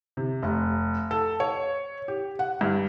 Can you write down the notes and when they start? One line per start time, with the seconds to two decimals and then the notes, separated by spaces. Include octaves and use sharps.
0.17 C3
0.42 F1
1.11 A4
1.40 C#5
2.08 G4
2.39 F#5
2.61 G2